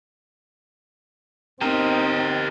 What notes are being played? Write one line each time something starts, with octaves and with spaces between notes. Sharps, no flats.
C4 D#4 G4 A#4